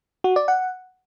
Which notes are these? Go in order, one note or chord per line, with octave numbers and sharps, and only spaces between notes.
F#4
D5
F#5